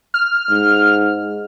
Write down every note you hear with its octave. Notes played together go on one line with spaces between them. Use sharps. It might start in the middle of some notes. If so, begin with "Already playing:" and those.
F6
G#2